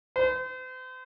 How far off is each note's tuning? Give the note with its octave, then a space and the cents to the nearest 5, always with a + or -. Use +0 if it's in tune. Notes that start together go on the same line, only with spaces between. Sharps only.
C5 -40